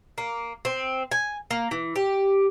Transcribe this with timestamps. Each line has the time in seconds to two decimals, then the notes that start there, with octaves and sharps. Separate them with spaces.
0.18 A#3
0.65 C4
1.12 G#5
1.51 A#3
1.71 E3
1.96 G4